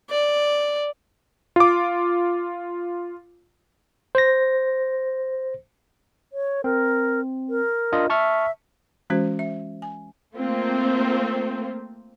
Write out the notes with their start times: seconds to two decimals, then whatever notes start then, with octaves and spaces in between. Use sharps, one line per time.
0.10 D5
1.56 F4 D6
4.15 C5 A#6
6.31 C#5
6.64 C4 A#4
7.49 A#4
7.92 D4 F4 D#5
8.10 E5 A5 C#6 F6
9.10 E3 G#3 C#4 F#4 C5
9.39 E5
9.82 G#5
10.35 A3 A#3 C4 F4